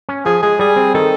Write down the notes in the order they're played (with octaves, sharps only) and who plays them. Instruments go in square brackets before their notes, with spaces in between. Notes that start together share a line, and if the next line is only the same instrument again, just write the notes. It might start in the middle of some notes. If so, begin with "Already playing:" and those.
[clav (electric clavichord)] C#4
[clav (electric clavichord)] F3 [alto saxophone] G#4
[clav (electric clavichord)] G#3 [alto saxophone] G#4
[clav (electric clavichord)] G3 [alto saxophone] G#4
[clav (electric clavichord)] C4
[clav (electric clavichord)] D#3 [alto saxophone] A4